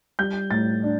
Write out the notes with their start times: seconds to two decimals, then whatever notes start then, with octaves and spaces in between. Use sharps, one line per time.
0.19 G3 G6
0.51 A2 A6
0.83 D4